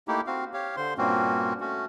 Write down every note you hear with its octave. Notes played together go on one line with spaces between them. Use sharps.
A3 A#3 D#4 E4 G4
C4 F#4 F5
G4 C#5 F5
D3 C5 C6
G2 A#2 A#3 C4 C#4 F#4
A3 C#4 F#4